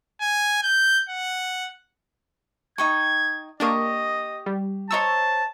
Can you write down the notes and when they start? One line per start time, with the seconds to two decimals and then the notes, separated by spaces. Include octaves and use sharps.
0.21 G#5
0.63 G6
1.09 F#5
2.78 D#4 G5 C#6 G#6
3.60 A#3 D4 G4 D#5 C#6 D#6
4.46 G3
4.91 C5 C#5 D#5 A5 A#5 C#6 E6